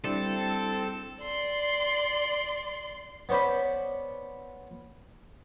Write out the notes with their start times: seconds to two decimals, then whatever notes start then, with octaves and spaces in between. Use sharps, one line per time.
0.04 G3 C4 D4 E4 A4
1.23 D5 C6
3.29 B3 C#4 C5 D5 B5